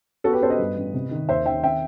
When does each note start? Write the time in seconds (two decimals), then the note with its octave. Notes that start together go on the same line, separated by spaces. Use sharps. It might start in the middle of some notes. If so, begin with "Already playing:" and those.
0.24 B3 F#4 A4
0.33 G4 B4
0.41 B3 A4 C5
0.50 B4 D#5
0.59 G2
0.76 A1
0.94 C3
1.11 D#3
1.28 D#2 C5 E5
1.46 D#3 E5 G5
1.63 C4 E5 G5